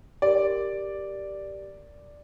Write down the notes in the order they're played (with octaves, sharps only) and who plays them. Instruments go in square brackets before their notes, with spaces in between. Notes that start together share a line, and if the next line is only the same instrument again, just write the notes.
[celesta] G4 A#4 [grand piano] D5